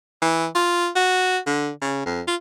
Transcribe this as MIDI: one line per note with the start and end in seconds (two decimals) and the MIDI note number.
0.22 0.46 52
0.55 0.88 65
0.95 1.38 66
1.47 1.70 50
1.82 2.01 49
2.06 2.21 41
2.28 2.35 65